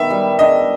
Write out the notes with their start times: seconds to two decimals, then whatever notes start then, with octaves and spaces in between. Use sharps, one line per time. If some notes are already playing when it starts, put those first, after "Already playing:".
Already playing: D#3 B3 E5
0.10 G3
0.39 D4 D#5